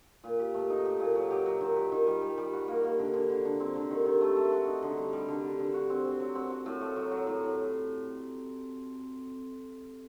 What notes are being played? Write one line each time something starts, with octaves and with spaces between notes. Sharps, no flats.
A#2
G4
A3
D#4
G4
A#2
F#3
G4
F#3
D#3
G4
D#3
G3
G3
G3
F#4
A#3
A#3
D3
D3
D3
D3
C4
D3
D#3
D#3
A3
A3
F#4
D#4
D3
G3
G3
D3
D3
D3
F#4
C4
C4
F#3
C4
F#4
A2
A3
F#3
F#3
A2
A2